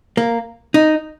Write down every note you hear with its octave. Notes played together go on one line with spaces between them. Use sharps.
A#3
D#4